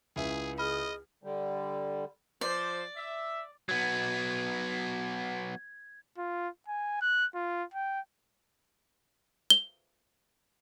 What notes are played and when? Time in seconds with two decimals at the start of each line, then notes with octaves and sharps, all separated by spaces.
0.16 C#2 E4 G#4 E5
0.58 G#4 D#5 B5 F6
1.24 D3 G3
2.41 F3 C5 D5
2.95 E5
3.69 F#3 B3 G#6
6.18 F4
6.68 G#5
7.02 F#6
7.34 F4
7.74 G5
9.50 G7